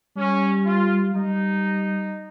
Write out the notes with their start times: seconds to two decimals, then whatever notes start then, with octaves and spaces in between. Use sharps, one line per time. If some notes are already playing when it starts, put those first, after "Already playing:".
0.16 G3 C#4
0.66 F4
1.15 G3 D#4